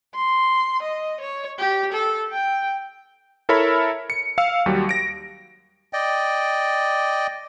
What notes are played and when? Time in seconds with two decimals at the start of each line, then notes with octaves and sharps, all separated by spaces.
0.15 C6
0.82 D#5
1.20 C#5
1.58 G4
1.93 A4
2.33 G5
3.49 E4 A4 A#4 C#5 E5 B5
4.10 C#7
4.38 F5 E6 C#7
4.66 D#2 F#3 G3
4.89 A#6 D7
5.93 D5 D#5 G5